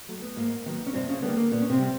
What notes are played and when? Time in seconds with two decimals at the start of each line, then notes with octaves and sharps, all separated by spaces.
0.09 F#3 A3
0.22 B3
0.37 G#2 A#3
0.66 D#3 F#3 B3
0.87 C#4
0.93 G2 C3 C4
1.09 C#3 C#4
1.22 D3 G3 A#3 B3
1.37 A#3
1.51 A#2 B3
1.61 C#4
1.70 C3 C4
1.79 G3